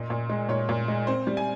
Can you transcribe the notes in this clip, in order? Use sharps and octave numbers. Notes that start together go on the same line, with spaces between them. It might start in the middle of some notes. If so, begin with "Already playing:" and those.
Already playing: A#2 D#5
A#2
G#3
A#2 C#5
A#2
G#3
C4 C5
G3
G#5